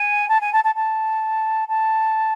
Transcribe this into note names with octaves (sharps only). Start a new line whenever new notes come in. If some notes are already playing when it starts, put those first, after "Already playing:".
Already playing: G#5
A5
G#5
A5
A5
A5
A5